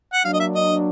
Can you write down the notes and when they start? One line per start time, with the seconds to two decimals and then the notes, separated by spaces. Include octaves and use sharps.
0.13 F#5
0.25 F#3 A#3 D4 F5
0.33 D#5
0.40 E5
0.55 D#5